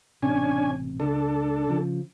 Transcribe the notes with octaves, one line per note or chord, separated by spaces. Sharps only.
E1 A1 C3 C#4 D4 G#5
C#2 D4 A4
C#3 F3